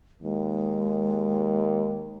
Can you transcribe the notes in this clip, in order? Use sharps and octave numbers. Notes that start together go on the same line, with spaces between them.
D#2 G#3